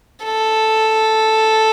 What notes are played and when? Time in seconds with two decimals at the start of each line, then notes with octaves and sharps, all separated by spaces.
0.25 A4